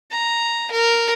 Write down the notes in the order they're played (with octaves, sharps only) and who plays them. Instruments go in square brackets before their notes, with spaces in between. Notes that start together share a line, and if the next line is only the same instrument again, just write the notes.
[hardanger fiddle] A#5
A#4